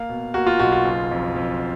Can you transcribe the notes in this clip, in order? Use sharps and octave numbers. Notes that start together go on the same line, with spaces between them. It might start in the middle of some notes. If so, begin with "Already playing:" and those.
Already playing: A#3 F5
B2
A#3 F#4
F4
B1 F#4
F4
F#1
F2
F2